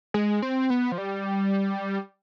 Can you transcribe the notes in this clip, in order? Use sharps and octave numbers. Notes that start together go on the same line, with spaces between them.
G#3
C4
B3
F3
G3